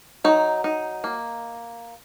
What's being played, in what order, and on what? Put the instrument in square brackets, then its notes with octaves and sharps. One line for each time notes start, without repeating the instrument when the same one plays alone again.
[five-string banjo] F#3 D#4
D#4
A#3